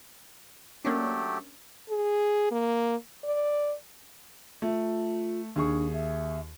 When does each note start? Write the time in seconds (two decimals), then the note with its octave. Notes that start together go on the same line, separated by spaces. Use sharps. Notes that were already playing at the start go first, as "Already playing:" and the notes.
0.85 F#3 A3 A#3 C#4 D4 G4
1.90 G#4
2.51 A#3
3.24 D5
4.62 A3 F4
5.56 D#2 D4 G#4 C#6
5.93 E5